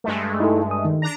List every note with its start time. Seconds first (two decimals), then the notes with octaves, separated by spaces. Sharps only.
0.04 G2 G#3 A3
0.40 D#4 E4 A4
0.71 D#6
0.85 D#3
1.02 D4 A#5